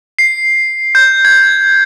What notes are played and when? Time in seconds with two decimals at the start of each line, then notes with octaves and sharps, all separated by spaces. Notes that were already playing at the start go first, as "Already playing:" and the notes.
0.19 C7
0.95 G6
1.25 G#6